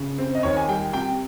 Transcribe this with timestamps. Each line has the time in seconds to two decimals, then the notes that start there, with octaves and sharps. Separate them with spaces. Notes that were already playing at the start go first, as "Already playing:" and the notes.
Already playing: C#3
0.18 C4
0.35 D#5
0.43 D#2 C#5
0.57 G#5
0.68 G3 G5
0.93 C3 G5